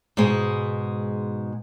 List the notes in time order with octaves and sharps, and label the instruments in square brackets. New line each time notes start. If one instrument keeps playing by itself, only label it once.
[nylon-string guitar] G#2 B2 G#3